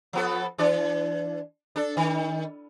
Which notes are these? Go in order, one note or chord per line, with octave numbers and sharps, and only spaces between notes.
F3 B3 A4
E3 D4 D5
D4 A4
D#3